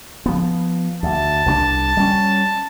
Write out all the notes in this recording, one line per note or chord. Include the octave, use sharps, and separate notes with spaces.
F3 B3
D2 A5
C2 G#3 D4
G3 C#4